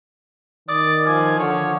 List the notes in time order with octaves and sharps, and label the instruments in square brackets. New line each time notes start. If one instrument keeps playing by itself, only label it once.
[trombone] D#3 [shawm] D5 [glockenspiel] D#6
[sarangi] F3 [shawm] G#5 [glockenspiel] D6
[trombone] D3 [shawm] C#5